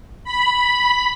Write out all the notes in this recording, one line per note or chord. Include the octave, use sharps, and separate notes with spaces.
B5